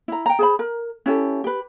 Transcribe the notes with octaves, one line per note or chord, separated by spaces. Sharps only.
E4 A#5
G5 A#5
G#4 C5 B5
A#4
C#4 E4 G4 A4
G4 B4